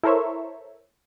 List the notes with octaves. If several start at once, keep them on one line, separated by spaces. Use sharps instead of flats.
E4 A4 A#4 C5 C#5 E5